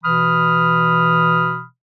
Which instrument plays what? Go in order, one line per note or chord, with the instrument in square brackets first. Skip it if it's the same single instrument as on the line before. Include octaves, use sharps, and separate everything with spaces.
[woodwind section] B2 E3 B5 D#6 F6